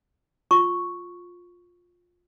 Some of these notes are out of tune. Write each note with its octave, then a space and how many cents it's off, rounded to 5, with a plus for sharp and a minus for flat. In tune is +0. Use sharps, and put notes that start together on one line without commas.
F4 +15 C#6 +0